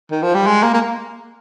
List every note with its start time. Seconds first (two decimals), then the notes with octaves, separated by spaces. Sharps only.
0.11 D#3
0.23 F3
0.34 G3
0.47 G#3
0.63 A#3
0.74 A#3